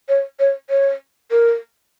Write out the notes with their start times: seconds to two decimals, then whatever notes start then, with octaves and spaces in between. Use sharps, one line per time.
0.09 C#5
0.40 C#5
0.70 C#5
1.31 A#4